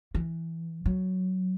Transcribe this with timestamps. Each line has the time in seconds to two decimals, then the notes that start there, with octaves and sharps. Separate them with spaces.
0.14 E3
0.86 F#3